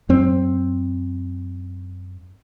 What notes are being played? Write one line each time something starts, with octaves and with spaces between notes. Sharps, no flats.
F#2 C4